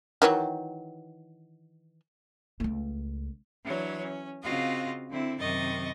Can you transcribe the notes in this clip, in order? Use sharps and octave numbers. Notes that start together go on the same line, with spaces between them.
D#3 E3 F#3
C#2 A3
E3 F#3 D4 C#5
C#4
C#3 C4 F4 F#4 D#5 F5
D3 C4 E4
F#2 C3 D#3 D#5 C#6 A6